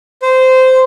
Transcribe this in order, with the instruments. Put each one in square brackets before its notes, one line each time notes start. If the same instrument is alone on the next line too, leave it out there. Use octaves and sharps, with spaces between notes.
[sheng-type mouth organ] C5